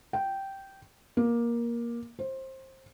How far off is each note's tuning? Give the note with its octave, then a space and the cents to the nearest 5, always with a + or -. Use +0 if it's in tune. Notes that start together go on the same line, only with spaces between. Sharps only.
G5 -10
A#3 +15
C5 +20